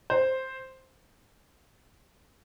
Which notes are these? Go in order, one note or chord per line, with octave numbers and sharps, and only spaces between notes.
C5